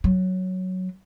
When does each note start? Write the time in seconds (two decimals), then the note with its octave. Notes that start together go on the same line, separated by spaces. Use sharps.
0.04 F#3